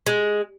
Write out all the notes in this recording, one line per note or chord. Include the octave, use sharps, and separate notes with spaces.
G#3